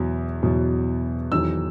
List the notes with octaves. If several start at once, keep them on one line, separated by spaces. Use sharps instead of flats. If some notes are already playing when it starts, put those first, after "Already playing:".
Already playing: E2 B2 F#3
E2 B2 F#3
E2 D#3 F#3 E6